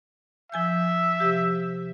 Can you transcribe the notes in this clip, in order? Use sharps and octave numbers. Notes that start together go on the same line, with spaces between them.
F3 E5 G#5 G6
C3 F3 G4